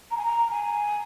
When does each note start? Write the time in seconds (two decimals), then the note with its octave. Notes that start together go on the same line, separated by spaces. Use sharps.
0.11 A#5
0.17 G#5
0.25 A#5
0.51 G#5